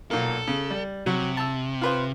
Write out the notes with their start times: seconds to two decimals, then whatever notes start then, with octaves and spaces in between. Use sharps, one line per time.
0.11 B1 A#2 A#3 A4
0.48 C#3
0.71 G3
1.06 C3 F#3
1.37 A5 E6
1.81 F4 B4 C5